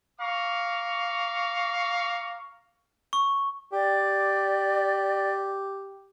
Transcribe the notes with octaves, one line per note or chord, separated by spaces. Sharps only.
F5 A#5 C#6 D6
C#6
G4 D5